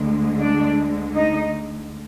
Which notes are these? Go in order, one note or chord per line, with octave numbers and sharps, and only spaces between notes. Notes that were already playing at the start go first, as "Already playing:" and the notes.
Already playing: D2 D3 G#3
D4 D5
D#4 D#5